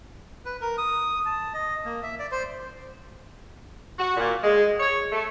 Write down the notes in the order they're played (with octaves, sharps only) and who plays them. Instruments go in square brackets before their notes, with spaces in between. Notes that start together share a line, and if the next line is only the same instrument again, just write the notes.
[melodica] B4
A#4
D#6
A5
D#5
A#3
E5
D5
C5
[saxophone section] F#4
A#2
G#3
C#5
A3